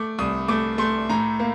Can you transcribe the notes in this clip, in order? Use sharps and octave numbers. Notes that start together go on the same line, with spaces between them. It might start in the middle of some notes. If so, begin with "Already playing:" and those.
Already playing: A3 D6
C2 D#6
A3 D6
A3 C6
A2 A#5
A#3